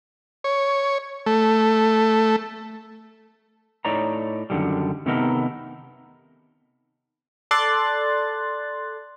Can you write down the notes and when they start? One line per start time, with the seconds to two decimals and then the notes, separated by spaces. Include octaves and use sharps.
0.44 C#5
1.26 A3
3.85 A2 D#4 C#5 D5 A#5
4.50 F#2 D3 D#3 G3
5.06 C3 D#3 A3 B3 D#4 A#4
7.51 A4 D5 C6 F#6 A6